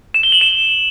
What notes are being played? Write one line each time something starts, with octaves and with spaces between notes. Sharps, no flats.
E7
G7
F#7
E7